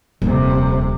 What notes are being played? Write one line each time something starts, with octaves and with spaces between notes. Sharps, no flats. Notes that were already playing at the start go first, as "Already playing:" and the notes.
D#1 F2 C3